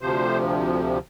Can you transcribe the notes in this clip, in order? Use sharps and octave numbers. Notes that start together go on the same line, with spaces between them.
D2 C3 F3 C5